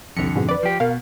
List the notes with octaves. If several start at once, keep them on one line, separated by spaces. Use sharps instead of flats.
C2 F2 D3 C#7
G#2 B2
B4 D5
F3 G4
B2 A#4 F5